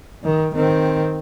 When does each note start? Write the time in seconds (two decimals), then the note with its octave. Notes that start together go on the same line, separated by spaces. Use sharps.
0.24 D#3
0.55 D#3 C4